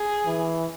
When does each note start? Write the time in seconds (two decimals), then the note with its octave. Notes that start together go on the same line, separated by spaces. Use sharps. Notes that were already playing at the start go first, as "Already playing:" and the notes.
Already playing: G#4
0.26 E3